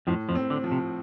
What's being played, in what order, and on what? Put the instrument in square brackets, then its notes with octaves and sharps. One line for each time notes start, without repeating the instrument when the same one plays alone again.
[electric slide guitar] F2 F3 [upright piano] A2
[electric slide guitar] F2 F3
[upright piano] C4
[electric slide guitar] D3
[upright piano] F3
[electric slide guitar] C3